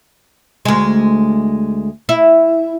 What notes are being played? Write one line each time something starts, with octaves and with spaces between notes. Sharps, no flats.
D2 G#3
E4